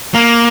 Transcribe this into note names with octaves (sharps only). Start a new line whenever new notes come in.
A#3